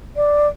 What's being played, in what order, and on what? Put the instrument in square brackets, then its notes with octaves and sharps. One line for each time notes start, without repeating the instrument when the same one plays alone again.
[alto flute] D5